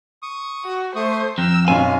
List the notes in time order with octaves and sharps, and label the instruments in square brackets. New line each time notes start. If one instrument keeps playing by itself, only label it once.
[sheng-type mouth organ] C#6 D#6
[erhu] F#4
[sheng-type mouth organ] A3 C#6 D#6 [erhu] C5
[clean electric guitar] F2 [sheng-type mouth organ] G5 A#5 [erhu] E6
[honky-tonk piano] B1 F#2 C4 [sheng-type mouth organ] C#4 [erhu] F5 [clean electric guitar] G#5